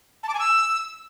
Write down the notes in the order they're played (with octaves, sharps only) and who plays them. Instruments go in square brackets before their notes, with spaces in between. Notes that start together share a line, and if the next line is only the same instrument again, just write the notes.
[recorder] A5
D6
G#5
E6